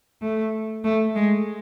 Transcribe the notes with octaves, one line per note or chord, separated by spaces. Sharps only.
A3
A3
G#3